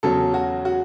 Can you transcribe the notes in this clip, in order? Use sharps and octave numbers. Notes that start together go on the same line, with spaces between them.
E2 C#3 F#3 C#4 A4
F#4
F#4